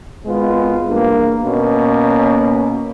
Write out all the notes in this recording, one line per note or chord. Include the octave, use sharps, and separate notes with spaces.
G#1 G#3 B3 F4
E2 G2 A#3
B2 A#3 C#4